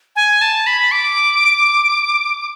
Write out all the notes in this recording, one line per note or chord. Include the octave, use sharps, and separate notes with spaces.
G#5
A5
B5
D6